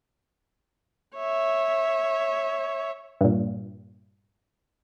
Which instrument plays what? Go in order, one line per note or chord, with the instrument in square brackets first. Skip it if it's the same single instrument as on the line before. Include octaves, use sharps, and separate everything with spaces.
[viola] C#5 E5
[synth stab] G2 A#2